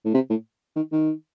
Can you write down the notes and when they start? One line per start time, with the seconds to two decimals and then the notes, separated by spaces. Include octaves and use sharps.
0.05 A2
0.15 C3
0.30 A2
0.76 D#3
0.92 D#3